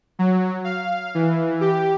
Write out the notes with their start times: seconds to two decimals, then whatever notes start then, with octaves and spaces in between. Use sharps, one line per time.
0.19 F#3
0.64 F5
1.15 E3
1.61 G4